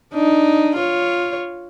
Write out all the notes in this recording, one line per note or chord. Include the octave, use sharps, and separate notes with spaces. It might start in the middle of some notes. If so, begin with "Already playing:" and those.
D4 D#4
F4 C#5